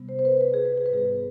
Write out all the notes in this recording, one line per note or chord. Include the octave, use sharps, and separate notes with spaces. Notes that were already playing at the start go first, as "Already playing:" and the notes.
Already playing: C3 G3 B3
C5
C5
B4
B4
G#4
B4
G#4
B4
G#2 G3 B3 G#4